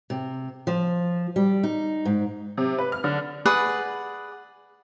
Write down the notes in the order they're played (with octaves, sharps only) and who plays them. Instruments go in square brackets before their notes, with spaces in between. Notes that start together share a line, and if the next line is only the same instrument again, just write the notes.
[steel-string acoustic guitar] C3
F3
G3
D#4
G#2
[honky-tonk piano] C3
B4
F6
D3
[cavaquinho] G#4 B4 D5 F#5